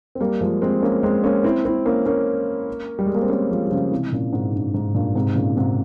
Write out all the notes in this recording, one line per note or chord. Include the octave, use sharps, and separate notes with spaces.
C4
G3 A#3
F3 G#3
G#3 C4
A#3 C#4
G#3 C4
A#3 C#4
C4 E4
C4 E4
A#3 C#4
A#3 C#4
G3
G#3
A#3
C4
A#3 C#4
F3 G#3
G3
C#3 F3
C3 E3
A#2 C#3
G#2 C3
G2
G#2
G2 A#2
G#2 C3
A#2 C#3
G#2 C3